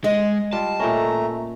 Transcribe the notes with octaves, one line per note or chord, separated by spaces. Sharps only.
G#3 D#5
G3 F4 A5
A#2 A3 C#4 A#5